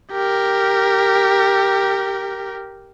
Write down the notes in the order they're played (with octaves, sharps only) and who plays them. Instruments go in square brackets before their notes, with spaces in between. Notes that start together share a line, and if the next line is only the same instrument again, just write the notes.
[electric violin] G4 A#4